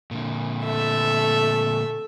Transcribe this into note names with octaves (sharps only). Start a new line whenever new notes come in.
A#2 D3
A3 E5